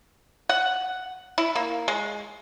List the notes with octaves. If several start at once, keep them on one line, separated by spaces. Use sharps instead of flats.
F#5
E4
A#3
G#3